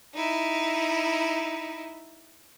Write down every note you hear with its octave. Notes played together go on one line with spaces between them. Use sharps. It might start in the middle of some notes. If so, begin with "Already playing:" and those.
D#4 E4